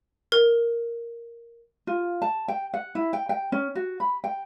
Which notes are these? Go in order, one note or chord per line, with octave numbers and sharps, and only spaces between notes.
A#4
F4
A5
G5
F#5
E4
G5
G5
C#4
F#4
B5
G5